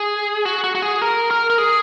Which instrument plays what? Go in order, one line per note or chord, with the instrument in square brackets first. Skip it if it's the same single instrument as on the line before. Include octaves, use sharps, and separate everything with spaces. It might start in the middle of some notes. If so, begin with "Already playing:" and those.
Already playing: [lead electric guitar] G#4
F#4
F#4
F#4
G#4
A#4
A#4
A#4
G#4